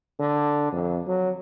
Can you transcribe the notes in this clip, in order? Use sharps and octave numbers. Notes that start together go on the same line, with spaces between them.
D3
F2
F#3